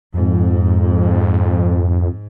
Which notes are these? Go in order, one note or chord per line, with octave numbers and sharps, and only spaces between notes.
F2 G#2